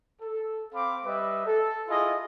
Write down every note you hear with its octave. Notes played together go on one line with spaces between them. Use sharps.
A4
C4 F5 B5 D6
G3 B4 D#5 E5
A4
E4 F4 G#4 D#5